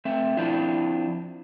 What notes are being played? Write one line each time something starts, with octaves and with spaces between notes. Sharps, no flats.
A3 C4 E5
F3 C4 D4 E4 F4